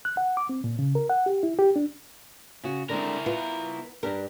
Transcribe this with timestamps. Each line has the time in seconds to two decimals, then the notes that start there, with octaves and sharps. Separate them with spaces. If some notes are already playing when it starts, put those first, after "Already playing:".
0.05 F#6
0.17 F#5
0.37 D6
0.49 C4
0.64 A#2
0.79 C#3
0.95 A#4
1.10 F#5
1.26 G4
1.43 E4
1.59 G4
1.76 D4
2.64 C#3 F#4
2.89 D3 G#3 C4 E4 A#4
3.26 B3 F4
4.03 G2 D4 G4 A#4